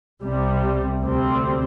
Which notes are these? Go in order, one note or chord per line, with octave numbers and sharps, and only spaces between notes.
C2 C3 G3
D2 C3 G3 C4